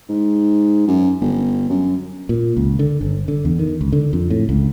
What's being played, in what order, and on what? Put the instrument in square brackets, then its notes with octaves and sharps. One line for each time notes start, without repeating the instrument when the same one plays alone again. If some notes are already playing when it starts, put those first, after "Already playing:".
[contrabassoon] G#2
F#2
G1
F#2
[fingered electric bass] A#2
C#2
D3
G1
D3
E2
D#3
C#2
D3
F2
A2
C#2